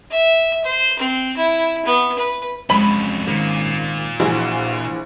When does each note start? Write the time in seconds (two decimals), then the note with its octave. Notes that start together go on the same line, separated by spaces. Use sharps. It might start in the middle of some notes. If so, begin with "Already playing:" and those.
0.11 E5
0.65 C5
0.99 C4
1.37 E4
1.85 B3
2.18 B4
2.70 F2 F#3 G#3 C#4 B5
3.27 G#1 A#2 A#3
4.20 A#1 E3 F#4 G#4 F5